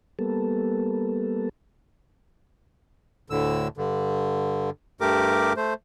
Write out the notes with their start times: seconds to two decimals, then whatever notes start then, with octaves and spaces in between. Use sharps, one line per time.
0.19 G3 A#3 B3 A4
3.30 D2 A2 D3 E6
3.77 G2 D3
5.01 G2 A3 G4 A#4 D6
5.57 A3 C5